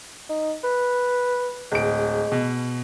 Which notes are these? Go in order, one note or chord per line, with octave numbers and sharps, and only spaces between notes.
D#4
B4
D1 G#3 D7
B2